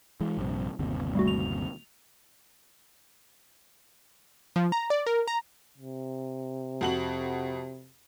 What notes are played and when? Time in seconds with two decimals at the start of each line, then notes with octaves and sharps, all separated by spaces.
0.21 E3 G#3
0.38 A#1 G2 C3
0.79 G1 D#2 C3
1.15 G3 A3 F#4
1.28 F7
4.56 F3
4.72 A#5
4.90 D5
5.06 A#4
5.27 A#5
5.78 C3
6.81 F2 F#4 F#7